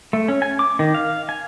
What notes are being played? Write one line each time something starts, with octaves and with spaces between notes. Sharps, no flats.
A3
C#4
G#5
D6
D#3
F5
G#5